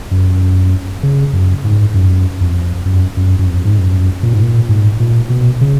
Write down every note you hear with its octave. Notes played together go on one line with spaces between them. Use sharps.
F#2
C#3
F#2
G#2
F#2
F2
F#2
F#2
F#2
F2
G#2
F#2
A#2
G#2
A#2
G#2
A#2
B2
C#3